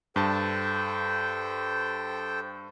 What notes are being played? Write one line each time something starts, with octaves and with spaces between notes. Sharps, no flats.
G2 A4 C5 G5 A5